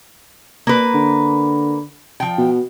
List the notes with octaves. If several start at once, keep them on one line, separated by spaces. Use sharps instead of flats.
A#3 B4
D3
F3 G5
B2